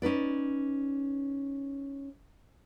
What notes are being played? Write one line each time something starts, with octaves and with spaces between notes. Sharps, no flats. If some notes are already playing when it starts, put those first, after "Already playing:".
C#4 D#4 B4 D5